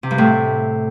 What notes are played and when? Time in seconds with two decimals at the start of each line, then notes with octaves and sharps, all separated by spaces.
0.03 C3
0.11 G2
0.18 A2